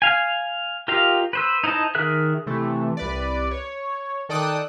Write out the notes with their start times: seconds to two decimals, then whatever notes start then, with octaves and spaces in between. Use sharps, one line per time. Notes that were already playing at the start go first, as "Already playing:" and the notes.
0.02 F5 G#5
0.88 F4 G4 A#4 D#5 F5
1.33 B4 C5 E6
1.64 D#4 E4 C5 D#5 A5
1.95 D#3 G#4 A#4 E5 F#6
2.46 C3 E3 A3
2.97 C2 B4 D5
3.51 C#5
4.29 D#3 A4 D5 G5 D#6 F#6